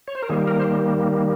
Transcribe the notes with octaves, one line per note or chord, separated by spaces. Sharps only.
C#5
C5
A#4
D#3 G3 A#3 G#4
A#4
C5